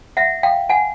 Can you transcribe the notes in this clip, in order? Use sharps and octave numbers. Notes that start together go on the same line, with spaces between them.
E5 F#5
F5 G5
F#5 G#5